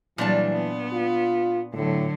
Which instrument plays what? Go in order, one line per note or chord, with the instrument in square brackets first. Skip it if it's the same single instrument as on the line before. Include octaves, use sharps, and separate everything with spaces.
[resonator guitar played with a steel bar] A#2 D4 A5 [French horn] E3 [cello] F#3 G3
[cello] B3
[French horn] F4
[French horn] A2 [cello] D3 F#3